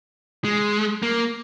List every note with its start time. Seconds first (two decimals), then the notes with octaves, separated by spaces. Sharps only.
0.44 G#3
1.03 A#3